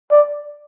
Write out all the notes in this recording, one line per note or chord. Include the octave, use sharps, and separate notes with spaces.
D5